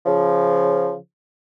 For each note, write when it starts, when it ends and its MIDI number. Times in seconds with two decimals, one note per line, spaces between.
0.06 0.94 49
0.06 0.94 53